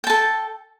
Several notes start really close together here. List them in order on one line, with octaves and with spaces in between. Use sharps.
G5 A5 A4